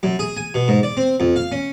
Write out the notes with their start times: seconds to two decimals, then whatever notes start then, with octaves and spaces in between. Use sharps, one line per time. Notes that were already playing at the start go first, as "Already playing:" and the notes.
0.03 F#2
0.19 G#4
0.37 G#5
0.54 B2
0.68 G#2
0.83 D5
0.97 C4
1.20 F2
1.36 F5
1.52 C#4